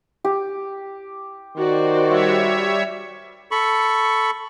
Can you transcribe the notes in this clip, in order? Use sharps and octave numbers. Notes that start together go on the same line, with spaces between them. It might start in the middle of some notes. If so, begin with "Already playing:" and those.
G4
D#3 F#4 C5 D5
G3 C#5 E5
A4 B5 C#6